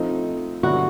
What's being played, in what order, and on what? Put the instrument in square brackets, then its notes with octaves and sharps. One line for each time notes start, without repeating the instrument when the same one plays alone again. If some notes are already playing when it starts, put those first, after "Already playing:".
Already playing: [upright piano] F3 A3 C4 D#4
[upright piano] G2 D3 F#3 B3 E4 [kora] F#4